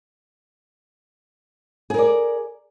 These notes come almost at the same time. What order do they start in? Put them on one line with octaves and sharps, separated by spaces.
G#4 A#4 D5